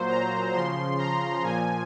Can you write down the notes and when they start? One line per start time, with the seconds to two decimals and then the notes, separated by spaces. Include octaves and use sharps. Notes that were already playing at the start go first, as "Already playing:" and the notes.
Already playing: A#2 F#3 C5
0.08 A#5
0.53 C#3 F3 C6
0.98 A#5
1.43 A#2 F3 G#5